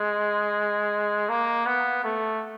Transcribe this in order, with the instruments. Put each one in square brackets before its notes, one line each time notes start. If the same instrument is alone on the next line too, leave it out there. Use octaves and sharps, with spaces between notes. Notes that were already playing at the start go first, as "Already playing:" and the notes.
Already playing: [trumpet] G#3
A#3
B3
A3